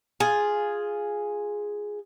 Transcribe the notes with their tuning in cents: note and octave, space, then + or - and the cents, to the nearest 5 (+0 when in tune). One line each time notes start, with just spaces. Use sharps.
F4 +0 G#4 +0